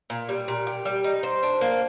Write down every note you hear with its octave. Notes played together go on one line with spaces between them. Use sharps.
A#2
G3
A#2
G4
G3
D#4
C5
D4
A#3